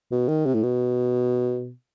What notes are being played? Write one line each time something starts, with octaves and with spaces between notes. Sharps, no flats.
B2
D#3
C3
A2
B2